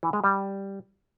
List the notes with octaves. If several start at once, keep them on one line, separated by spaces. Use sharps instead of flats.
E3
G#3
G3